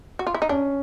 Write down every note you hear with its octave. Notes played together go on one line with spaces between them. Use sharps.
F#4
F4
E4
D#4
C#4 D4